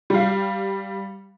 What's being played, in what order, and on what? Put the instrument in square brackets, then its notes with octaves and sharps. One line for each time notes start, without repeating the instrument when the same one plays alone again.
[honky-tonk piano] G3 F5